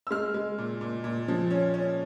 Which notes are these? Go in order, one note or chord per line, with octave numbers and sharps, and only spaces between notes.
E6
G#3 F6
G#3
A#2
A#2
A#2
F3
C#4
C#4